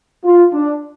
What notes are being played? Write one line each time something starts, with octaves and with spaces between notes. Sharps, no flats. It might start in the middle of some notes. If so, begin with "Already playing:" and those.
F4
D4